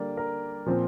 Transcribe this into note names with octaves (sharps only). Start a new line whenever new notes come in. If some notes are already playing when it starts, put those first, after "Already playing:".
Already playing: D3 G3 A#3 D5
A#4
A#2 F3 C4